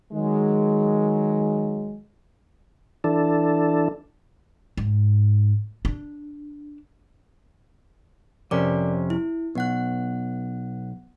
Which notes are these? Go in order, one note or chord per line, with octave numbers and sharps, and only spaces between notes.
D#3 F#3 G#3
E3 D4 A4
G#2
D4
F2 C3 C#4 A#4 D5 D6
E4
B1 B3 F#5 F#6